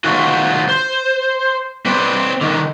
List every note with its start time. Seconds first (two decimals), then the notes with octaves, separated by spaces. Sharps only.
0.04 D#3 F#3 A3 F4 F#4
0.69 C5
1.85 C4 B4 C5 D5
2.41 D3 D#3